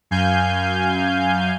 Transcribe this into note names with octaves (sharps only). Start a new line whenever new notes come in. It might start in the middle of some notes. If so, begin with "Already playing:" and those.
F#2 F5 G#5 G6